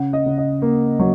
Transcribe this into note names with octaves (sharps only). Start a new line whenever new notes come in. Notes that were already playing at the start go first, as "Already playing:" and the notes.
Already playing: C#3 F#5
D#5
C#3
D#5
A#3
F#3